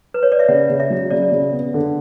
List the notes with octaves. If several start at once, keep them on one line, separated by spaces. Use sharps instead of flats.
B4
C#5
D5
E5
C#3 F#5
C#3
E5
F#3
C#3 D5
C#3
B3
D3